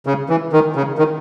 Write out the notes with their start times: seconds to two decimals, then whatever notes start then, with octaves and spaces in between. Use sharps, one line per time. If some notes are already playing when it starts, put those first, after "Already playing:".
0.06 C#3
0.29 E3
0.53 D#3
0.76 C#3
0.98 D#3